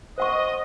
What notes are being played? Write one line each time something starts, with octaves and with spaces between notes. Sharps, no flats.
C5 D#5 F#5 C#6